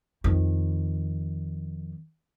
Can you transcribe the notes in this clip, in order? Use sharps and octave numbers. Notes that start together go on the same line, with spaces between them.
F2 D#3